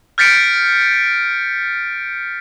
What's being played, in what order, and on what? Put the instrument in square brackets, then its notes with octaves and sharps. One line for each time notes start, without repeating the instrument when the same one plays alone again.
[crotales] F6 G6 A6 B6 C#7 D7